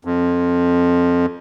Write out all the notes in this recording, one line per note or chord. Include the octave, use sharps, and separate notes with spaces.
F2